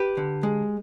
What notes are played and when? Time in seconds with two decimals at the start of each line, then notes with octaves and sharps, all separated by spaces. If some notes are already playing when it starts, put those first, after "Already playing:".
Already playing: G4 B4
0.17 D3
0.43 G#3